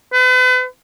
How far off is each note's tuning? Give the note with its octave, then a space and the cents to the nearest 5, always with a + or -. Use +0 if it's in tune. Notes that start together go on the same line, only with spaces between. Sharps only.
B4 +40